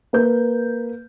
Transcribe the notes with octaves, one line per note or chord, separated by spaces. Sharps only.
A#3 B4 G6